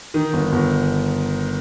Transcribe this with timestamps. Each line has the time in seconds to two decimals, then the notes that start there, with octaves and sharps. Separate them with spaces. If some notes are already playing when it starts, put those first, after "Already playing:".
0.14 D#3
0.33 G1
0.52 G1